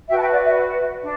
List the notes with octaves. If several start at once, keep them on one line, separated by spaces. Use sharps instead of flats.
F#4 B4 E5 G5
A5
E5 G5
D5 F#5
E5
D4